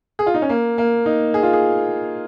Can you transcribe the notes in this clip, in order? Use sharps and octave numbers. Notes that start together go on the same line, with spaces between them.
G#4
F4
D#4
C#4
A#3
A#3
D#4
G#4
F4
G#4